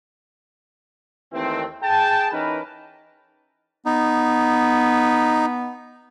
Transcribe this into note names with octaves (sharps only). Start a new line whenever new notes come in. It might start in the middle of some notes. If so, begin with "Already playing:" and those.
D#2 D#3 E3 A3 C4
G#4 G5 A5
E3 C#4 D#4 A#4 B4
B3 D#4